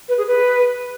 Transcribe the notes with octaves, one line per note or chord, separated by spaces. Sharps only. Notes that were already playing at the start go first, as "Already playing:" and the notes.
B4
G#4
B4